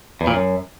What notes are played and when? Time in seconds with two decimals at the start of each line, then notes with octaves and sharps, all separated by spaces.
0.21 E2
0.27 A#2
0.34 F#2